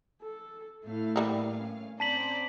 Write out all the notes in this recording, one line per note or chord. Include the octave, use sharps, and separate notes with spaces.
A4
A2 A3 E4 F5
E3 G3 A#3
C#4
C4 C#4 C5 D5 A5 A#5 B6 F#7